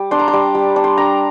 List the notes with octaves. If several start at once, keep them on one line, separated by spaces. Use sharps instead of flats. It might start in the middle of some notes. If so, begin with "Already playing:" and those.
Already playing: G3
D4 C6
A#5
C6
G3
G3
D4
C6
D4 A#5